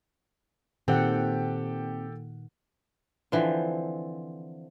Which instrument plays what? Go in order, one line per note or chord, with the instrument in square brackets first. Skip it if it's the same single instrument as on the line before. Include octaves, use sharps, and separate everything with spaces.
[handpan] A#2 D#3 F#5 [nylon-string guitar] C4 [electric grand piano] G4 A4 G5
[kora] D3 E3 F3 C4